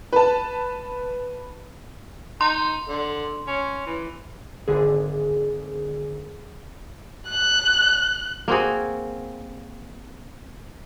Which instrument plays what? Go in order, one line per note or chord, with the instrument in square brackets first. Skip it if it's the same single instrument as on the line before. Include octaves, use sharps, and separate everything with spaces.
[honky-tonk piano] B4 A5
[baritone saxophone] D#4 [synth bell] C6
[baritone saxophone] D3
C#4
E3
[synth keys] G#1 D3 G#4
[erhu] F#6
[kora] A#3 C4 F#4 G#4